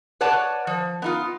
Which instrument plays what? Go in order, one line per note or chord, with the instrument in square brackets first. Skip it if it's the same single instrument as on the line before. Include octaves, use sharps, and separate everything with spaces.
[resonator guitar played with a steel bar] B4 C#5 D5 F#5 A5
F3
B3 D#4 F4